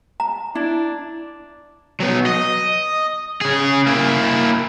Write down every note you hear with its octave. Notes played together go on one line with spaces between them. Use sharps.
A#5
D4 E4
F#3 B3
D#5
C#3 G#4
A#3 E4